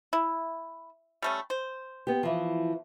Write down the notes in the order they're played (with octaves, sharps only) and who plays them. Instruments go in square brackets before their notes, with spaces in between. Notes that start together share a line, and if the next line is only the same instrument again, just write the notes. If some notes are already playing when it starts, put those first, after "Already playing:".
[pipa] E4
G3 A3 C#4
C5
[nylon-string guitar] B3 G4
E3 F3